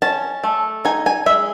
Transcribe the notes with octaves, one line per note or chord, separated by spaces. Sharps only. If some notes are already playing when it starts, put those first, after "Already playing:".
C#4 A5
A3
D#4 G#5
G#5
G#3 E5